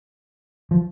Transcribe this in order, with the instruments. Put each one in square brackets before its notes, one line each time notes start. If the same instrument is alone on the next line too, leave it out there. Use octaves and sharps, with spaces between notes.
[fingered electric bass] F3